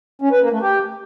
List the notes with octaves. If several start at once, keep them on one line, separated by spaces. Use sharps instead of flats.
C#4
B4
A#3
A3
G4